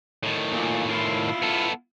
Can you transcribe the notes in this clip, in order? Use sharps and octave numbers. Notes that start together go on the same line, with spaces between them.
A2 D#3
A#2
E4 F4
B3 A4